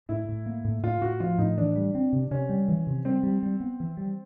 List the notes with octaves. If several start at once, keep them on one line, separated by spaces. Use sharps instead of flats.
A2 E4
A2
A#3
A2
A2 F4
A2 F#4
F3 F4
A2 D#4
E3 D4
G3
C4
C3
C3 C#4
G3
E3
C3
G3 C4
G3
G3
B3
E3
G3